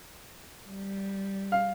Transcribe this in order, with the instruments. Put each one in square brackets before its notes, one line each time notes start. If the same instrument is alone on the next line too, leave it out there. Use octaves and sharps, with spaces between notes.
[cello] G3
[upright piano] F5